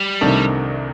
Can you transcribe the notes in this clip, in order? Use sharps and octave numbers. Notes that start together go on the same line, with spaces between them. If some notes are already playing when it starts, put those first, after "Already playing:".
Already playing: G3
C2 C3 D#3 A3 D4